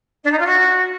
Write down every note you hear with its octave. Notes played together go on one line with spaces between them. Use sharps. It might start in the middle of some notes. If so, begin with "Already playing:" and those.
D4
D#4
F4
F#4